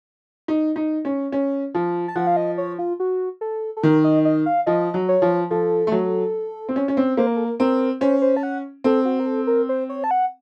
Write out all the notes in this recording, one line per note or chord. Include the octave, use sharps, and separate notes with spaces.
D#4
D#4
C#4
C#4
F3
A5
F3 F#5
F5
D#5
C#5
F4
F#4
A4
A4
D#3 A#4
D#5
D#5
F5
F3 D#5
F#3
C#5
F3
F3 A4
A3
F#3
C4
C#4
C#4
C4
A#3 C5
A#4
A4
A#4
C4 A#4
C#4 C5
C5
A5
F#5
C4 A4
F#4
A#4
A4
A#4
C5
C#5
A5
F#5